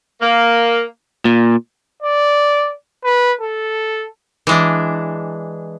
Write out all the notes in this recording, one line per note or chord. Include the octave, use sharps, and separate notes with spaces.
A#3
A#2
D5
B4
A4
E3 G#3 D4